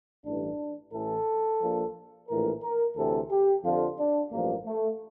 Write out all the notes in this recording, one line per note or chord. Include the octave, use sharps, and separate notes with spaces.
A1 G2 E3 D4
A1 A2 E3 A4
A#1 A#2 F3
A#1 A2 E3 A#4
A#4
D2 C3 E3 A4
G4
F2 D3 F3 F4
D4
A1 G2 F3 A#3
A3